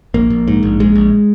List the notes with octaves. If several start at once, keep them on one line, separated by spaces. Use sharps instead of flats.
A#1 A#3
A#1
G#2
A#1
A#1 G#3
A#1